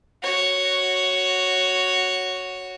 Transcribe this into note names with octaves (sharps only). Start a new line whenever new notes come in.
F#4 C#5